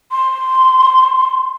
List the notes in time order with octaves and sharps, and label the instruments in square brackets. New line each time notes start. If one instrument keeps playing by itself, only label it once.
[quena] C6